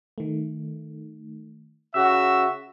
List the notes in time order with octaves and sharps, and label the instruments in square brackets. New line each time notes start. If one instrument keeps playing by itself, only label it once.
[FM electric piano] D#3 A3
[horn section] C#3 F#4 E5 [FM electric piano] E6